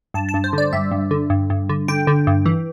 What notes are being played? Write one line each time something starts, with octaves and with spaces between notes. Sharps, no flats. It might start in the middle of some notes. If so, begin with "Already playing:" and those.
G2 A5
A5
G2
C5
D3 D5
G2 E5
G2
D3
G2
G2
D3
D3 G5
D3
G2
E3